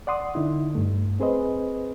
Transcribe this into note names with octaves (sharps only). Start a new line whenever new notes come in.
D5 F#5 C6 D#6
D3 D#4 E4
G2 A3
C4 G#4 B4 C5 D#5